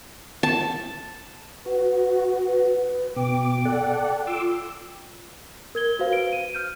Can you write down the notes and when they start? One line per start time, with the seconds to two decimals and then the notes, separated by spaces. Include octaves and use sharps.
0.43 A5
1.66 F#4 B4
2.46 B4
3.16 B2 G5 D6
3.65 A4 D5 F#5
4.27 F4 C6 D6 E6
5.75 A#4 G#6 G7
5.99 F#4 B4 C5 F5
6.12 B4 D7 G7
6.33 D#7
6.54 F6 G6 D#7